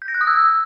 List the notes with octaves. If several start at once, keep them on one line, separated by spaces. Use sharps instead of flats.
G6
A#6
F#6
D#6
E6